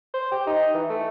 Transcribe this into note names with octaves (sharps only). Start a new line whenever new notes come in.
C5
G4
D#4
E3
A3